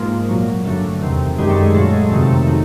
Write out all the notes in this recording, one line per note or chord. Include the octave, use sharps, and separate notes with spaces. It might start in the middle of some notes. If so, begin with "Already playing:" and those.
Already playing: G#2 F3 G#3 A#3
A#2 F#3
G2 D3 F#3 A3
E2 C3 D#3
F#2 D#3 G3 G#3
A3
G#3
A#2 F#3 A3
G#3
F2 C3 D#3 F#3 A3
A3
A3
D#3 F#3